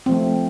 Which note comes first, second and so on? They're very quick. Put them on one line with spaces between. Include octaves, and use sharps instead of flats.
C4 F3 A3